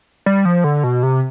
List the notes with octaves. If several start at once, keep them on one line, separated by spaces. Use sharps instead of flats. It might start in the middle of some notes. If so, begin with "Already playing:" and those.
G3
F3
D3
B2
C3